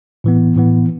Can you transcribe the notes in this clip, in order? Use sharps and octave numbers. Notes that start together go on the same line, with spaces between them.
A2 E3 B3
A2 E3 B3